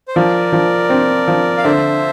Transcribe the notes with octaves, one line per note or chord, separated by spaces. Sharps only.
C5
F3 A#4 D5
F3
C4
F3
F5
D3 C5 E5